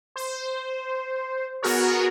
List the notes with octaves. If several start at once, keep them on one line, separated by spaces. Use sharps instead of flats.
C5
B3 F#4 G#4 A#4 C#5